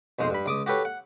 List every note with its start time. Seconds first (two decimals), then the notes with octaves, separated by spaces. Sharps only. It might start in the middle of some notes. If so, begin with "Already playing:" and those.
0.19 B1 F2 G#3 C5
0.30 G2 B5
0.46 C#2 D6 D#6
0.66 F#4 G4 A4 B4 C#5
0.85 F#5